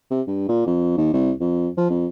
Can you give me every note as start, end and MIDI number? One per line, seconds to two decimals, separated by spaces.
0.10 0.21 48
0.27 0.45 43
0.49 0.65 46
0.67 0.95 41
0.97 1.13 39
1.14 1.31 36
1.41 1.69 41
1.77 1.85 53
1.90 2.07 41